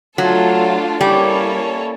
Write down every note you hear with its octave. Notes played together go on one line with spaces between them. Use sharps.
F#3 A3 D4 F4 A4
G3 A#3 C#4 E4 A4 C#5